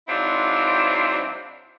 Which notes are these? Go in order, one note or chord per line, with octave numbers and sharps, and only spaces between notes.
G#2 F#3 C4 D4 E4 F4